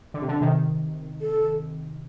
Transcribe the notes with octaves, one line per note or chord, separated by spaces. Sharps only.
D3
C3
D3
C3 D#3
A4